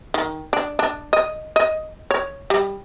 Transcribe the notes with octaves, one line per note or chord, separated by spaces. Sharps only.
D#3
D4
D4
D#5
D#5
C#5
G3